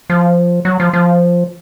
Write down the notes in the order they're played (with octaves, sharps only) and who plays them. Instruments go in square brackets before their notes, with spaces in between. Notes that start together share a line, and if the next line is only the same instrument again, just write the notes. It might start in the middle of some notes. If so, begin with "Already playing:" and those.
[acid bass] F3
F#3
F3
F3